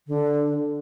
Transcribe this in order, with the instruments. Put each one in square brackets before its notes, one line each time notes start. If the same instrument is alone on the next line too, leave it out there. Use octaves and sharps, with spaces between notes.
[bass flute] D3